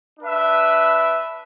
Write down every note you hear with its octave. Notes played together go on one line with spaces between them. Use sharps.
D4 B4 E5